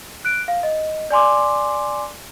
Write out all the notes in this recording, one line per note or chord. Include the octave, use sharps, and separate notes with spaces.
F#6 D7
F5
D#5
D5 G#5 C6 D6